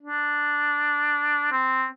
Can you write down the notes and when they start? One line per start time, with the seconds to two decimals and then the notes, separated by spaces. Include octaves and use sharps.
0.03 D4
1.52 C4